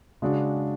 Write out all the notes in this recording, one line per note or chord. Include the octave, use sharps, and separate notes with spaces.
C#3 G#3 D4 F#4